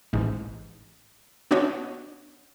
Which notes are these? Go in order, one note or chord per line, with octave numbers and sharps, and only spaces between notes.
A1 G#2
B3 C#4 D4 F#4 C#5 D#5